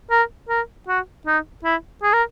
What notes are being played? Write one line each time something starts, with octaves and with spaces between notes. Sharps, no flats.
A#4
A#4
F#4
D#4
E4
G#4
A#4